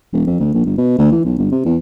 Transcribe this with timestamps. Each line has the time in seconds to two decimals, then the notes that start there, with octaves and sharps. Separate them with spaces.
0.13 E1
0.27 F2
0.39 D2
0.54 A#1
0.66 G1
0.78 B2
0.98 D2
1.12 E3
1.25 B1
1.38 G1
1.51 C3
1.65 E2